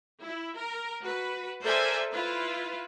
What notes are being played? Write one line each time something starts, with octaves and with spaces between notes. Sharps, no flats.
E4
A#4
F#4 B4
A4 A#4 C5 D5 E5 G#5
E4 F4 B4